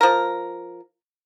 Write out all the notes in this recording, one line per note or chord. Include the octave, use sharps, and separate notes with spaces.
F3 A#4